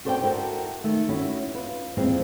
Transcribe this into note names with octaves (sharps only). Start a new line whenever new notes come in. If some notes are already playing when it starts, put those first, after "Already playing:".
F#4 A4 C5 D5 E5 G5
E4 F#4 A4 A#4
D#3 A3
C#4 E4 F#4
F4 B4
F2 A#2 E3 G#3 C4